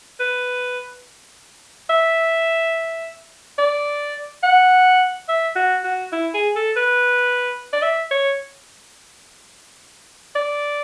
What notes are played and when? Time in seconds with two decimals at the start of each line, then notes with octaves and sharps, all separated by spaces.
0.20 B4
1.90 E5
3.58 D5
4.43 F#5
5.29 E5
5.56 F#4
5.84 F#4
6.12 E4
6.34 G#4
6.56 A4
6.76 B4
7.73 D5
7.82 E5
8.11 C#5
10.35 D5